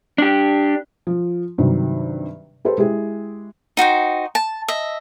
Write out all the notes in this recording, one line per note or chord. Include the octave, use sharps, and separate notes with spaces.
D4 G4
F3
G2 C3 D#3 F#3
G4 A4 B4 C5
G#3 E4 G4 G#4
D#4 F#4 C5 G5
A5
D#5 E5